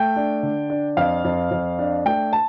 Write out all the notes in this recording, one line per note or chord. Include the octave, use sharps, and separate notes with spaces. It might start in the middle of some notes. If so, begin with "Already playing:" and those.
Already playing: A3 G5
D4
D3
D4
F2 F5
F2
F2
D4
A3 G5
A5